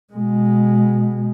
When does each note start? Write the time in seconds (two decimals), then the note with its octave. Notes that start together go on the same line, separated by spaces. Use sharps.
0.14 B2 G#3